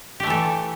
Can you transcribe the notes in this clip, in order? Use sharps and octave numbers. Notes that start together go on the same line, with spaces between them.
E3 A3 G4 A4